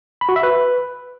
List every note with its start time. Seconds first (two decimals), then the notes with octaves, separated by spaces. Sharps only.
0.21 B5
0.29 F#4
0.36 E5
0.43 B4